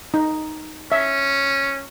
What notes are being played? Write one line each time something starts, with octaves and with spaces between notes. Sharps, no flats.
D#4
C#4 E5